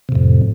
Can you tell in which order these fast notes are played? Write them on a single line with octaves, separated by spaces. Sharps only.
C3 A2 F2